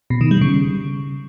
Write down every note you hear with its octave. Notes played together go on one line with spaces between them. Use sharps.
B2
D#3
G3
C#3